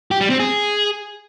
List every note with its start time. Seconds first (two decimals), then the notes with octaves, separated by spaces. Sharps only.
0.11 G4
0.21 G3
0.30 C4
0.40 G#4